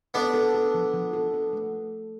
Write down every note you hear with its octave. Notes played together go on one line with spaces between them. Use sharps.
B3 D4 A4
A4
A4
F3
F3
A4
A4
A3